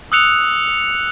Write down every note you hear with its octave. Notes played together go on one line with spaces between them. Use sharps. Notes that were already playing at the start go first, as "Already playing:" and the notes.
D#6 E6 F#6 C#7 F7